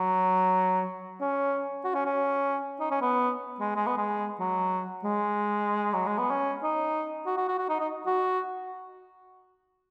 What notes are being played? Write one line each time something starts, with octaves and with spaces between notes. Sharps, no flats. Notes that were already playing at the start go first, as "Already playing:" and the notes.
Already playing: F#3
C#4
F#4
C#4
C#4
D#4
C#4
B3
G#3
G#3
B3
G#3
F#3
G#3
F#3
G#3
B3
C#4
D#4
F#4
F#4
F#4
F#4
D#4
D#4
F#4